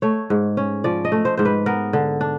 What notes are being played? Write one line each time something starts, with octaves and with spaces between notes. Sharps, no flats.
A3 C#5
G#2
C#4
F3 D5
D#5
A3
C5
G#2 C5
B4
B3 A#4
D3
D4